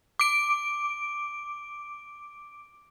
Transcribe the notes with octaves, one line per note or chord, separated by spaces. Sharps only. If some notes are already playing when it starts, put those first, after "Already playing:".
D6 D7